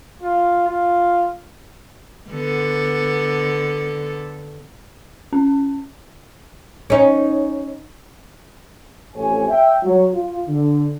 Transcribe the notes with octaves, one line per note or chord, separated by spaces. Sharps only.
F4
F4
D3 B3 A4
C#4
C#4 D#4
A1 F2 A3 G4 C#5 G#5
E5 G5
F#3
F4
D3